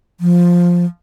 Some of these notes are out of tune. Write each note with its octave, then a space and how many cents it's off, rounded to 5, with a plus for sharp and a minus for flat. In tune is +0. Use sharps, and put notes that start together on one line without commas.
F3 +5